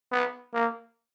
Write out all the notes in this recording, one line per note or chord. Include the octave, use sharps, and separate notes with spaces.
B3
A#3